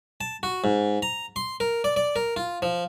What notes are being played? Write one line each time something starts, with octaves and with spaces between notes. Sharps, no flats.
A5
F#4
G#2
A#5
C6
A#4
D5
D5
A#4
F4
F3